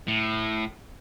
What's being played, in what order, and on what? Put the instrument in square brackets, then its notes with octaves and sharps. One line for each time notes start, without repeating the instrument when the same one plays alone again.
[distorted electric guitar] A2